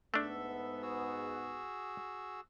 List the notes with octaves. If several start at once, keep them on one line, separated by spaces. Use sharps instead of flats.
G#2 A3 B3 D4 A4 E5
F#4 G#4 E6